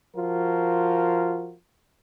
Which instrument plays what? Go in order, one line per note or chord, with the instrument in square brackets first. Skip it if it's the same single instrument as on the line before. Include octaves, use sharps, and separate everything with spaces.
[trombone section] F3 F4 F#4 A#4